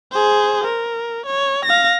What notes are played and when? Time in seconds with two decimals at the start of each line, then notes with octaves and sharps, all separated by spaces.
0.12 G#4 C5
0.64 A#4
1.26 C#5
1.65 F5 A#6